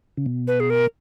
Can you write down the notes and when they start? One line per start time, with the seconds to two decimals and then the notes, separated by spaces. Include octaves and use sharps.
0.17 C#3
0.26 B2
0.48 B4
0.60 G#4
0.70 A#4